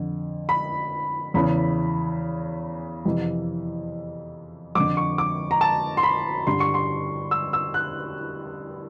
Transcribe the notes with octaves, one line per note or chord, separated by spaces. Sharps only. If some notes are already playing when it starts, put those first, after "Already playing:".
Already playing: F2 D3
B5
E2 C#3 E3 B5
F2 C3 E3
F2 D3 D6
C#6
D6
A#5
A5
C6
B5
G2 D3 C6
C#6
C6
E6
E6
F#6